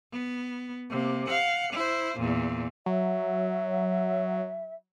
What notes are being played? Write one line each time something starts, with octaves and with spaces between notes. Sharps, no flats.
B3
C3 A#3
F5 F#5
E4 C5
E2 A#2
F#3 E5